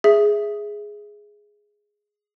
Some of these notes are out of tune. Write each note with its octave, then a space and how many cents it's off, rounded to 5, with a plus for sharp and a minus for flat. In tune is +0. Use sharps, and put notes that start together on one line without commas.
G#4 +0 E5 +0